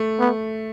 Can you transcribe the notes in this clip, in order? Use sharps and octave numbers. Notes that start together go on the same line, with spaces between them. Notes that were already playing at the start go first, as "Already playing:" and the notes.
Already playing: A3
B3